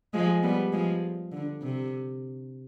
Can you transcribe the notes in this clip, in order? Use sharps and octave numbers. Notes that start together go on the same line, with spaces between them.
F3 G#3
G3 B3
F3 G#3
D3
C3